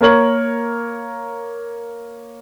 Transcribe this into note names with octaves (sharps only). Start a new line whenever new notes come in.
A#3 A#4 C#5 F#7